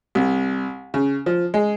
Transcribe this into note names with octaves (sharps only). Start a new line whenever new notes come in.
C2
C#3
F3
G#3